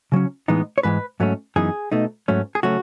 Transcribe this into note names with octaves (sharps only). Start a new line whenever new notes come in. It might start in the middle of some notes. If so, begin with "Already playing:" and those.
C#3 F#3 C#4
A2 E3 G#3 B3 D#4
C#5
G#2 E3 G#3 B4
G#2 F#3 A3 C#4
F#2 E3 B3 D#4 G#4
B2 A3 D#4
G#2 F#3 A3 C#4
G#4
C#3 F#3 A3 C#4 F#4